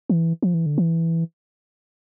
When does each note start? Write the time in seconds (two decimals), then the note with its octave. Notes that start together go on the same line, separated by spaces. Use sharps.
0.10 E3
0.42 F3
0.54 E3
0.66 D3
0.78 E3